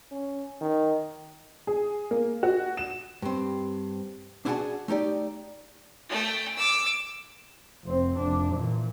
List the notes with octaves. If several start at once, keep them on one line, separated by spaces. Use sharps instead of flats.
C#4
D#3
G#4
A#3
F#4
E7
G2 C4
D4 E4 F#4 G#4 F#5 A5
A3 D#4 G4 D5
A3 G5
D6 E6
F1 C4
F1 D4
A#2 E3